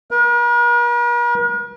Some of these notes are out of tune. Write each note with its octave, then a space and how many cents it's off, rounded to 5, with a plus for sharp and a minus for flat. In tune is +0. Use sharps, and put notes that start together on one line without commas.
A#4 +45